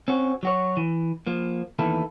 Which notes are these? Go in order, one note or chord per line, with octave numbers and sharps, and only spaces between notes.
C4 C#4 F#4
F#3 F#4 C#5
E3
F3 A#3
E2 D#3 E3 A#3 E4 A4